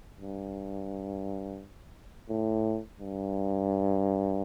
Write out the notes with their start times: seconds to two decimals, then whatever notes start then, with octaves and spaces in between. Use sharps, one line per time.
0.17 G2
2.30 A2
3.00 G2